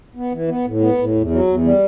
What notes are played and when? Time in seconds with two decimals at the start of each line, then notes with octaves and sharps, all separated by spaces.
0.15 B3
0.32 E3
0.48 B3
0.65 A2
0.81 B3
0.98 A2
1.15 E2
1.30 F#3
1.47 E2
1.64 G3